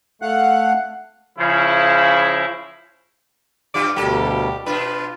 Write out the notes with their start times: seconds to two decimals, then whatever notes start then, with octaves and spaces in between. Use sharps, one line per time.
0.22 A3 F5 F#5 F#6
1.39 C#3 F3 E4
3.74 G2 G3 F4 D6
3.96 D2 B2 G3 A#3 G4 A4
4.30 G4
4.66 B2 D4 F4 B4